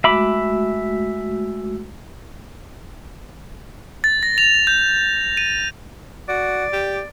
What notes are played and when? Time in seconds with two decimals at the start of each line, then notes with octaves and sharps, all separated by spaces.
0.04 G#3 A3 F#4 E5 B5 D6
4.04 A6
4.23 A#6
4.38 F7
4.67 G6
5.37 D#7
6.29 F#4 D5
6.73 G4